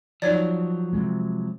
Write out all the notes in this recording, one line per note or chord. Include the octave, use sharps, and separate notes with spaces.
F3 F#3 D#4 C#5 D5
C3 G#3